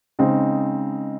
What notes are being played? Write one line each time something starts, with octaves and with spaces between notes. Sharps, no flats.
C#3 G#3 C4 D#4